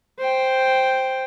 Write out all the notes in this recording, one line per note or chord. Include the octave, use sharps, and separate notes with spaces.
C5 G5